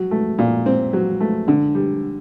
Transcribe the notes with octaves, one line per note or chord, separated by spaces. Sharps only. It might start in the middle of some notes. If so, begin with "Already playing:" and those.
Already playing: F#3
A3
A#2
C4
F#3
A3
D3
G3